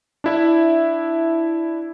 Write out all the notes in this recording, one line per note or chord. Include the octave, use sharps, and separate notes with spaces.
D4 E4 E5